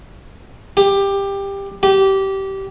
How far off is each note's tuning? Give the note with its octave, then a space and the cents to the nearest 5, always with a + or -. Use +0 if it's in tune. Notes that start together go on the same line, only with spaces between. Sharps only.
G4 +15
G4 -20